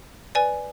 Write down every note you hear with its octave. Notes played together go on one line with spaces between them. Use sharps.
B4 D5 G#5